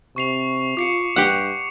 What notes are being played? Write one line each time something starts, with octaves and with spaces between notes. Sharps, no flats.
C3 C#6 C7 F7
F4 D6 C7 C#7
G2 G4 F#5